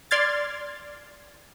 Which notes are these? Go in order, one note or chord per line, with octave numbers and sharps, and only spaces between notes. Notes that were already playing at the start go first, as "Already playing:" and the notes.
D5 C6 F6 G#6 A6